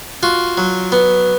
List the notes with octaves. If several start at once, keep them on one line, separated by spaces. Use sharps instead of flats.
F4 F#4
F#3
B3